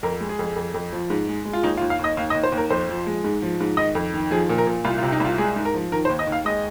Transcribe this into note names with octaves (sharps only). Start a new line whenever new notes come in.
F2 A#4
G#3
G#4
F2
F2
F2
F3
G#2
G#3
G#3
F4
D#2 D#4
F4
D#2
F5
D#2 D#5
D#2 F5
D#5
D#2
C5
D#2
A#4
F2 C5
F3
G#3
G#2
F3
G#2
D#3 D#5
F2
D#3
F3 G#4
A#2
A#4
A#2
C2 F4
F4
C3
D#4
C2 F4
G#3 G#4
G#2
A#4
F3
D#3 A#4
C5
D#2
D#5
D#2
F5
G#3 D#5